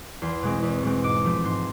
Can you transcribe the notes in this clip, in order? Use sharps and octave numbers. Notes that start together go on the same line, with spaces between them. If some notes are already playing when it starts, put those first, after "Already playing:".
E2 C6
B2 G#3 C4
E2
B2 G#3 C4
G#2 D6
F3 A3 C4
G#2 C6